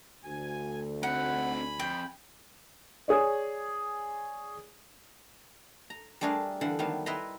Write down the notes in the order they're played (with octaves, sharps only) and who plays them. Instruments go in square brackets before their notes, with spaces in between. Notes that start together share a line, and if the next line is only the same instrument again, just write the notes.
[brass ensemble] D2 [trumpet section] G#5
[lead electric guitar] C4 D#4 [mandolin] F#5 [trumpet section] G#5 B5
[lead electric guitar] F2 [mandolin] G5
[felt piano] G#4 C#5 D5
[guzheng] A#5
G3 A3 D4 G#4 A#4 F5
D3 E3 F5 F#5
D#3 F#3 G3 B3 F5 A5
E4 B4 D#5 A5 A#5 C6